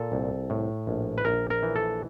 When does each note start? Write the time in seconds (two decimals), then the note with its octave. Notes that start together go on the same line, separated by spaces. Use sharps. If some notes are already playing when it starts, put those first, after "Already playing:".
Already playing: A#2 A4
0.12 C2
0.50 A2
0.87 A#1
1.18 B4
1.25 A#1 A#4
1.50 A#4
1.63 E3
1.76 A4